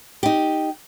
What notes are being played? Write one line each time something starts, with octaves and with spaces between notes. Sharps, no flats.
D#4 G4